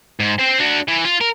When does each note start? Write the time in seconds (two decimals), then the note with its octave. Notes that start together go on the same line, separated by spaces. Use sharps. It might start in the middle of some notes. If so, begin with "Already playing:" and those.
0.20 G#2
0.39 C4 C5
0.60 D4 F#4
0.88 E3
1.05 F4
1.21 A#4